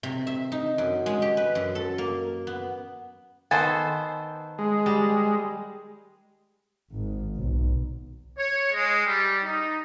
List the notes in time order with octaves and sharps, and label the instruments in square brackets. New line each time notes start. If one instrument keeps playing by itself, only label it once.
[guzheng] C3
E5
D#4
F#2
G#3
G4
B4
F#2
A4
A#3
B3
[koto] D#3 A4 C5 [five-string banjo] B3 G#5 A5
[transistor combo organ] G#3
[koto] G3
[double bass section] G#1
B1
[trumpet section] C#5
G#3
G3
D#4